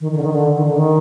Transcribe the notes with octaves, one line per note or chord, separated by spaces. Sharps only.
D#3
D#3
D3
D#3
D3
D#3
D3
D#3